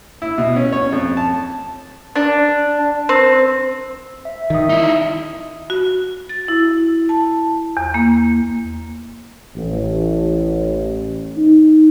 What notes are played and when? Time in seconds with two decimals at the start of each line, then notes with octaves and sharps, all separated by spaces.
0.22 E4
0.38 B2
0.56 C#4
0.73 C#5
0.92 F2
1.17 A5
2.16 D4
3.09 C4
4.25 E5
4.50 D#3 E5 D#6
4.70 D#4 E4
5.70 F#4
6.29 A6
6.48 E4
7.09 A5
7.77 E2
7.94 A#3
9.56 A1
11.37 D#4